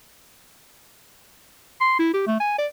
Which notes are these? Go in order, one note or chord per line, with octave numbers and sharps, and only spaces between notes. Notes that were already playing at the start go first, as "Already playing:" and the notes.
C6
E4
G4
A3
G#5
D5